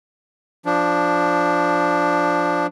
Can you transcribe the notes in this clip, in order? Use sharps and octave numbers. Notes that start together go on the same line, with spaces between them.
F3 D4